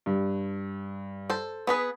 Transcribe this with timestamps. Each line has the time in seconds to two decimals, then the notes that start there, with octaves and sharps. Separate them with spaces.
0.06 G2
1.30 A4 C5
1.67 B3 G#4 B4